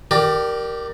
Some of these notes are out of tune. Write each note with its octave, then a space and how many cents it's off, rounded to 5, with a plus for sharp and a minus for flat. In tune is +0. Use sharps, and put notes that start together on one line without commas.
G4 -15 A#4 +0 D5 +20